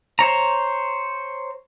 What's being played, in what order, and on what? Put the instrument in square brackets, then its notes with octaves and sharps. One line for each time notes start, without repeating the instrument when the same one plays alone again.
[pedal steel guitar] C5 C#5 A#5